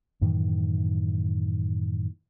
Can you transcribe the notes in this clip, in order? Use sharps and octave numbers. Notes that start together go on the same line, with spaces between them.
F#2 A2 D#3 E3